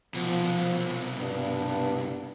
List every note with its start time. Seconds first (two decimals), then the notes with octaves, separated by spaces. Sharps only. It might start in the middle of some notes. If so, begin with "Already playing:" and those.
0.14 C2 B2 F3
1.19 G2 B3 D4